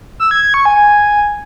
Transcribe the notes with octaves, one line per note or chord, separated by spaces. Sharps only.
E6
G#6
G#6
C#6
G#5